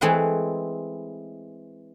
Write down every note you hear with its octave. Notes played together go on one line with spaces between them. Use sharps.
E3 G#3 A3 C4 G#4 B4